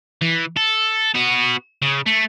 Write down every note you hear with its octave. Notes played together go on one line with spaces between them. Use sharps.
E3
A4
B3 F#4
C#3
A3